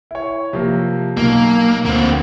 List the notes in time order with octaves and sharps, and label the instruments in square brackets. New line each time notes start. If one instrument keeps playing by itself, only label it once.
[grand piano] E4 C#5
C3 F3 A#3
[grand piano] B1 [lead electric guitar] A#3
[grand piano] D2 [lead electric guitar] A#3 C4